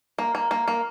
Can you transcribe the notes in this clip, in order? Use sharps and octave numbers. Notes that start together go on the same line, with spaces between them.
A#3
A#3
A#3
A#3